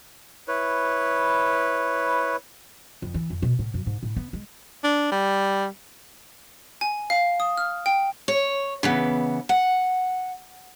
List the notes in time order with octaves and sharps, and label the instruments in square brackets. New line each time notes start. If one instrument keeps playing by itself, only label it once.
[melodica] E4 B4 C#5
[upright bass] F2
E3
F2
B2
A2
F#2
G#2
A2
B3
G#3
[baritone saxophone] D4
G3
[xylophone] G#5
F5
D#6
F6
G5
[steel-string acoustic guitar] C#5
C#3 E3 B3
F#5